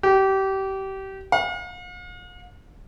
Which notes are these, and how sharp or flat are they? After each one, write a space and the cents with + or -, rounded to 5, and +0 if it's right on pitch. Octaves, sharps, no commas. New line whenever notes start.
G4 -25
F5 +45